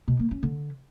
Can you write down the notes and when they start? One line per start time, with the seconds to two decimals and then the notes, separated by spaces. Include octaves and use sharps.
0.08 B2
0.19 A#3
0.31 C#4
0.43 D3